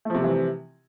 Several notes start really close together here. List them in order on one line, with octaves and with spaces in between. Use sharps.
A3 F3 C3 G3 E3